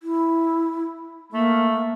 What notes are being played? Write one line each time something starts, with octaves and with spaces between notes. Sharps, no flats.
E4
A3 A#3